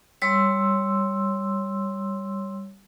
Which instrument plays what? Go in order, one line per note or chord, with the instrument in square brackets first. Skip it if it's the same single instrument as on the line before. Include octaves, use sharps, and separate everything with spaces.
[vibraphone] G3 C#5 C6 E6